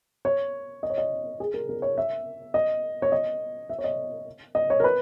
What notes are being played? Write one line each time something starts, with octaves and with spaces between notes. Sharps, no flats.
C#5
D#5
C#5
D#5
G#4
A#4
A#4
C#5
E5
D#5
C#5
D#5
E5
C#5
D#5
D#5
C#5
A#4
B4